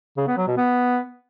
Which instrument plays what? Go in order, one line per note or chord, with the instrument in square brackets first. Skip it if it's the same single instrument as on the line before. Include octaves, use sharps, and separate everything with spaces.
[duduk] C#3
B3
F#3
B2
B3